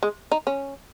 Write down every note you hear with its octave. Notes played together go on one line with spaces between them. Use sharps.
G#3
D#4
C#4